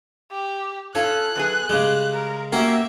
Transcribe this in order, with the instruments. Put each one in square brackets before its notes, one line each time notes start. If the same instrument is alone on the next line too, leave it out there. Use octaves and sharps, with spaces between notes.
[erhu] G4
[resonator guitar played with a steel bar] C#4 F4 A4 [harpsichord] C#5 [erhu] F#6
[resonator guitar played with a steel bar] F#2 B3 G#4
[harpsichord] C#3 G#3 [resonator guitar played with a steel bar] G3
[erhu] A#4
[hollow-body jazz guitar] A#3 [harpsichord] C#4 F#4 A#4 [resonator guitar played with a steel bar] G4 [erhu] E5